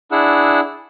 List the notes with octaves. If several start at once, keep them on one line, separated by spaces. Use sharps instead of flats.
D4 E4 G#4 F#5 E6